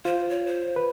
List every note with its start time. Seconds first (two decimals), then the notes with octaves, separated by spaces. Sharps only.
0.05 F4 C5
0.30 C#5
0.46 C5
0.76 B4